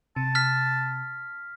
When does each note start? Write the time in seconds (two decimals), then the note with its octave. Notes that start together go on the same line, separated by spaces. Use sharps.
0.16 C3 A5
0.35 F6 B6